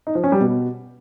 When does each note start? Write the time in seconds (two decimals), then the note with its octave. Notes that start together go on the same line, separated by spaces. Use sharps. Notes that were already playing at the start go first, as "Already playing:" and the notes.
0.07 D#4
0.15 F3
0.24 C#4
0.32 G3
0.40 B2